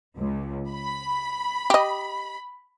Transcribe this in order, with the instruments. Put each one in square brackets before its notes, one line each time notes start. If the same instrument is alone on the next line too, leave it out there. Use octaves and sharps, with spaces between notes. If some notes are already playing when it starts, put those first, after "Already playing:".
[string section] C#2
B5
[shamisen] G4 D#5